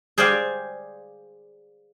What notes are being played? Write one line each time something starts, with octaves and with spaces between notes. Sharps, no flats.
G#4 C5 D5 F5 G5 G#5